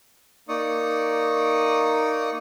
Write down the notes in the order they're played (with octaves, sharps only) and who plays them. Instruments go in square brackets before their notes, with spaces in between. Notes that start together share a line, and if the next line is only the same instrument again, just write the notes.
[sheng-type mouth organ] A#3 D#4 D5 C#6 D#6